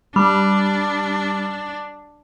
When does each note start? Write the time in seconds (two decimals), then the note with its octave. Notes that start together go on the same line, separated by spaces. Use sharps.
0.16 G3 D4